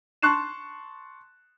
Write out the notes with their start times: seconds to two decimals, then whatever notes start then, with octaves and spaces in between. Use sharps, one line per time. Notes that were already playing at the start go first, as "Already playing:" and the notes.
0.22 A5 C6 C#6 F#6 C7 E7